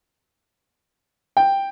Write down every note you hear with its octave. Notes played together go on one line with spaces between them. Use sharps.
G5